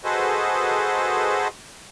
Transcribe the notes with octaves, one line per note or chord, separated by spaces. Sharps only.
F#4 G#4 A4 B4 C5 D#5